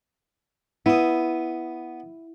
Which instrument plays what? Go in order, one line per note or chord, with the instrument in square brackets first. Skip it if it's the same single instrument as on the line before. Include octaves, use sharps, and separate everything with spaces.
[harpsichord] B3 D#6 [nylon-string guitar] E4